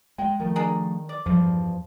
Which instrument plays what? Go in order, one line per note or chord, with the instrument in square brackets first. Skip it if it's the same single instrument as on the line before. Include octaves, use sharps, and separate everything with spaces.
[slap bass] G#3 [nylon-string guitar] G5
[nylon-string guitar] D#3 [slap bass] F3 A3
[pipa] D4 G#4 A#4
D5
[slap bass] E2 G2 G3 [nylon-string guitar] F3